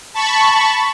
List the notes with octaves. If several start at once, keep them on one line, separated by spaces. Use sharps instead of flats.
A5 B5 C#6